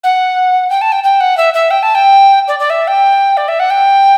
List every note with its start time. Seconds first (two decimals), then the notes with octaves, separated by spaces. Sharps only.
0.03 F#5
0.70 G5
0.81 A5
0.92 G5
1.03 G5
1.20 F#5
1.37 E5
1.53 E5
1.70 G5
1.82 A5
1.95 G5
2.48 D5
2.59 D5
2.70 E5
2.87 G5
3.37 D5
3.48 E5
3.59 F#5
3.70 G5